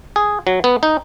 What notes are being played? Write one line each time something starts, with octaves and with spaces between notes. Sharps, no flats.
G#4
F#3
B3
D#4